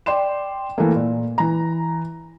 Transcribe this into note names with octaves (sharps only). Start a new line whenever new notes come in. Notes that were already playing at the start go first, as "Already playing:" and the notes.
D5 G5 C6 E7
E3 A3 A#3
A#2
E3 A#5